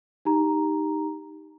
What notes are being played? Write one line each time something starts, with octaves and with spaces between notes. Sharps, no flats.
D#4 G4 A#5